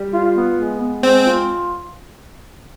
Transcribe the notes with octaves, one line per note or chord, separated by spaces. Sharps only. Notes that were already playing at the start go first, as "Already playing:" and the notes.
Already playing: G3
F4
B3
G#3
B3
G#3 C4
F4